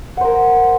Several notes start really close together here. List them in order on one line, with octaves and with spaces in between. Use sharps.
F#5 C5 A#4